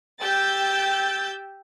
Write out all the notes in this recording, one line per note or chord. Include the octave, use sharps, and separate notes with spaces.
G4 G5 E6 G6 A6